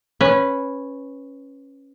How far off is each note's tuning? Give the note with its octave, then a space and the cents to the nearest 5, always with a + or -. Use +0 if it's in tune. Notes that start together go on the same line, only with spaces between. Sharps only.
C#4 -10 B4 +0